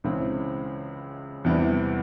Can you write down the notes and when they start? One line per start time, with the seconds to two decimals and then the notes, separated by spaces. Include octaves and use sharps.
0.04 C#2 C#3 E3 G#3 C4
1.44 E2 C3 E3 G3 B3